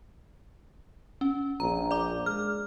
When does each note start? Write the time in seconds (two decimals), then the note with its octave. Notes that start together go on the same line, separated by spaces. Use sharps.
1.21 C#4
1.60 A#1 A#5
1.91 D5 D6
2.26 G#3 F6